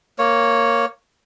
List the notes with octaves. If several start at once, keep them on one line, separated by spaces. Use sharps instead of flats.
A#3 C#5